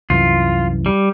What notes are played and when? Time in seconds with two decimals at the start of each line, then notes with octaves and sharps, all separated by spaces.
0.10 C2 F#2 E3 F4
0.86 G3